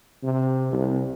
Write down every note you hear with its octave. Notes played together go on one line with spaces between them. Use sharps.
C3
C2